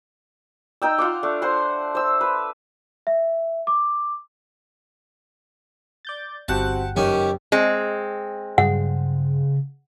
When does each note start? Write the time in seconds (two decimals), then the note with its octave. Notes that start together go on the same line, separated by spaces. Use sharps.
0.82 D#4 G5 E6
0.98 F4 F#5 D6
1.23 A3 D4
1.42 C5 F#5 C6
1.95 C5 E6
2.21 B4
3.07 E5
3.67 D6
6.05 D5 G6 A6
6.48 G1 C4 F#4 G4 F#5 G5 A5
6.96 F#1 D#3 C#4 G4
7.52 G#3 C4
8.58 G2 C#3 F#3 G3 F#5